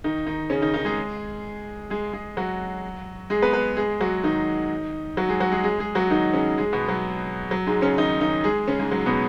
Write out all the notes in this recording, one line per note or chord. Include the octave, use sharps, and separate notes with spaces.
D#3 D#4
D#3 D#4
C#3 C#4
D#3 D#4
D#3 D#4
G#3 G#4
G#3 G#4
G#3 G#4
F#3 F#4
G#3 G#4
B3 B4
B3 B4
G#3 G#4
F#3 F#4
D#3 D#4
F#3 F#4
G#3 G#4
F#3 F#4
G#3 G#4
G#3 G#4
G#3 G#4
F#3 F#4
D#3 D#4
C#3 C#4
G#3 G#4
B2 B3
F#3
F#3
G#2 G#3
C#3 C#4
D#3 D#4
D#3 D#4
G#3 G#4
C#3 C#4
G#2 G#3
F#3
B2 B3